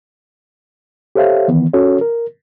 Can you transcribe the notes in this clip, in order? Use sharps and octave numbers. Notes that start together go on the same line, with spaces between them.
G4 A4 C5 C#5 E5 F5
D#3 E3 B3
C#4 F#4 A4 C#5
A#4